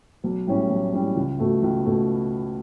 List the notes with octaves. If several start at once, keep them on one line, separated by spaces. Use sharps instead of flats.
B1
A2 G3 C#4
B1
A2 G3 C#4
C#2
B2 A3
C#2
B2 A3